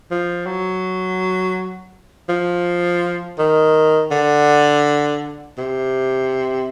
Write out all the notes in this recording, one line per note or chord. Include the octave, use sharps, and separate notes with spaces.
F3
F#3
F3
D#3
D3
C3